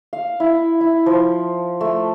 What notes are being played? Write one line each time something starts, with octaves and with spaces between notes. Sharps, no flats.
F5
E4
E4
F3
A3